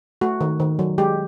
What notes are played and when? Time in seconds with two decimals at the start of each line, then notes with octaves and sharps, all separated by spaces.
0.21 A3 F#4
0.41 D#3
0.60 D#3
0.79 F#3
0.98 G#3 G4